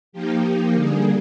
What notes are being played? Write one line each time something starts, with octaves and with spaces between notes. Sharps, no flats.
F3 A#3 D#4 G4
D3 G3 A#3 G#4